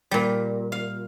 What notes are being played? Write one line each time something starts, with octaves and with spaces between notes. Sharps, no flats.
A#2 G3
F5